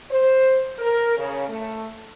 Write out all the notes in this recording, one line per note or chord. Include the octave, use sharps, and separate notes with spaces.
C5
A#4
C#3
A3